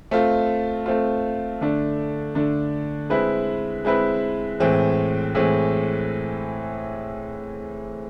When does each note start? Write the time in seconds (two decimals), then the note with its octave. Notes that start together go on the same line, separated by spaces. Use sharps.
0.11 A3 C4 F4
0.86 A3 C4 F4
1.61 D3 A3 D4
2.35 D3 A3 D4
3.10 G#3 C4 E4 B4
3.85 G#3 C4 E4 B4
4.60 A2 E3 G#3 C4
5.35 A2 E3 G#3 C4